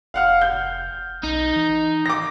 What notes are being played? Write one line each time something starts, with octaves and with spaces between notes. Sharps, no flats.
F1 F5 F#5 F6
G6
B1 D#4
E3
D6 A#6